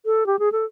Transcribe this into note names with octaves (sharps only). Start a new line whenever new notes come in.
A4
G4
G#4
A4